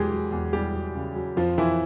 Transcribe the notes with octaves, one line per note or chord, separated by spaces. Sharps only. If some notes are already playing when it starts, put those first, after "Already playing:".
Already playing: E2 F#3 G#3 G4 G#4
F#3
E2
E2 G3 G4
F#3
C#3
F#3
F2 F3 F4
F2 E3 E4